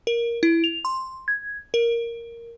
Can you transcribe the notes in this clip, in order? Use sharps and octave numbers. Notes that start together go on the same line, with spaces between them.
A#4
E4
F7
C6
G#6
A#4